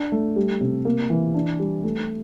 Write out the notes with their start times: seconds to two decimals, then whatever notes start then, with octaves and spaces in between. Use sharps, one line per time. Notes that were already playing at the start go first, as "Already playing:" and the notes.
Already playing: D4
0.12 A3
0.36 G3
0.61 C3
0.85 A#3
1.10 E3
1.34 D4
1.59 G3
1.84 A3